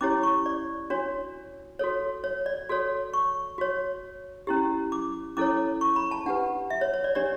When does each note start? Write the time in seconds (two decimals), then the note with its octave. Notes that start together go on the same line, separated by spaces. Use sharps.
0.01 C#4 E4 G4 C#5 D6
0.23 C#6
0.46 D5
0.90 D4 F#4 C#5
1.79 F#4 A4 C#5
2.24 C#5
2.46 D5
2.69 F#4 A4 C#5
3.13 C#6
3.58 F#4 C#5
4.47 C#4 E4 G4
4.92 D6
5.37 C#4 E4 A4 C#5 D6
5.81 C#6
5.96 B5
6.11 A5
6.26 D4 G4 B4 F#5
6.70 E5
6.81 C#5
6.94 C#5
7.04 D5
7.15 D4 G4 C#5 D5